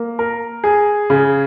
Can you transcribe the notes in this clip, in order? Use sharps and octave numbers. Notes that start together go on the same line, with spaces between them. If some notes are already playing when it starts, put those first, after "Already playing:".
Already playing: A#3
A#4
G#4
C#3